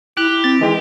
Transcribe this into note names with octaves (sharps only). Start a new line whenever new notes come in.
E4 G4 F#6
E4
C4 A6
D#3 E3 G#3 D#5